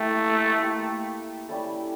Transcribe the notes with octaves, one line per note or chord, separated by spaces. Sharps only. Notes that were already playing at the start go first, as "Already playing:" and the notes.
Already playing: A3 A#3 E4 G4
A#3 E4 G4
G3 C#4 E4 A4